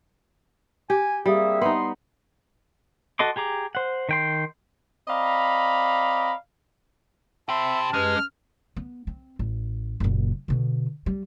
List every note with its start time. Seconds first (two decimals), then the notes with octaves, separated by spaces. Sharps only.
0.90 G4 G#5
1.26 G3 A#3 C4 G#4 E5
1.62 B3 D#4 C6
3.19 F#4 A4 D#5 C6 D6
3.36 G4 G#4 A#5 D6
3.75 C5 F#5
4.09 D#3 G5 C6
5.08 C4 D5 D#5 F5 A#5 B5
7.49 G4 C5 E5 A5 B5
7.94 F#2 G#3 G4 B4 F6
8.76 B3
9.07 C4
9.39 A1
10.00 F#1 A#2
10.48 B2 D3
11.06 G3